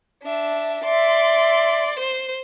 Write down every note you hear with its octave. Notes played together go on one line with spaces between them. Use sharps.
D4 E5
D5 E5 C6
C5